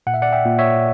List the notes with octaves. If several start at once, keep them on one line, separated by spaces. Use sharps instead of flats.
A#2 F#5
E5
D5 F#5
E5 G5
A#2
C#5 E5